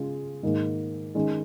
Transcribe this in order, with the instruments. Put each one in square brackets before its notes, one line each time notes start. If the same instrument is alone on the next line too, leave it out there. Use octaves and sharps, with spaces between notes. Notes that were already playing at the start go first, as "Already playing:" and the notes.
Already playing: [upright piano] C#3 G#3 F4 G#4
G#2 D#3 A#3
D#3 G#3 C#4